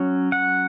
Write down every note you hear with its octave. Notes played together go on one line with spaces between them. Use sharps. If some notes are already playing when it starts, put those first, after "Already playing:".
Already playing: F#3 C#4
F#5